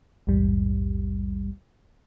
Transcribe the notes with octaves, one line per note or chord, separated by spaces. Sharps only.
A#1 E2 G#2 G3